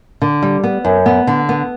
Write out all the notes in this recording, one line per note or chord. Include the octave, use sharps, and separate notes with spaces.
D3
G3
B3
F#2
B3
D3
B3